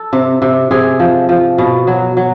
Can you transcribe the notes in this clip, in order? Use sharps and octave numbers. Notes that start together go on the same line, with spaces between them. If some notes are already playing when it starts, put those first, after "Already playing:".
Already playing: A4
C3
C3
C3 G#4
F3
F3
B2
F#3
F#3